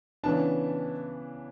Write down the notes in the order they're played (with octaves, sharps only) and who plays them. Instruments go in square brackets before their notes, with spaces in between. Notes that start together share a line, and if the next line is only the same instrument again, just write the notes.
[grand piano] C#3 E3 B3 D4 A5